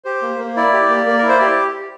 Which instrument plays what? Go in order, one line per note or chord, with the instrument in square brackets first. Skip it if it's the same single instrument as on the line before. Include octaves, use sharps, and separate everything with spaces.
[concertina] G4 C5
A#3
A#3
E4 D5
G4
A#3
A#3
A#4
E4
C5
G4 D5